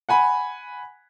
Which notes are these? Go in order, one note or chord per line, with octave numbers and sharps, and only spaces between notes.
F#5 G#5 B5